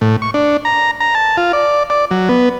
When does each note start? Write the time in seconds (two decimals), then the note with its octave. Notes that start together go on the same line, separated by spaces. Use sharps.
0.01 A2
0.22 C#6
0.34 D4
0.65 A#5
1.00 A#5
1.15 A5
1.37 F4
1.53 D5
1.90 D5
2.11 F#3
2.29 B3